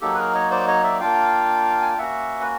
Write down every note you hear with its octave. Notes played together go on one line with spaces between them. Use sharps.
F#3 A#3 D#4 G4 A4
B4
G#4 A#4
C#5 D#5
C5 D5
C#5 D#5
D5 E5
A#3 D4 F4 F5 G5
G#5
G5
A#3 C#4 F#4 E5 F#5
B4